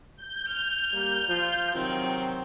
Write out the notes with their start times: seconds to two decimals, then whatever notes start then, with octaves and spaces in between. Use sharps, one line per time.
0.16 G6
0.48 F6
0.93 G3 A#3
1.28 F3 F4
1.74 C3 D#3 F#3 C4